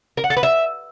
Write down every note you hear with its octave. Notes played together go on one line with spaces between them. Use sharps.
A#4
F#5
A4
B4
E5